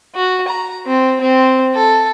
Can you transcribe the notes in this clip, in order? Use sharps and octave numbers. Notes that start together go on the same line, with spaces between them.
F#4
A#5
C4
C4
A4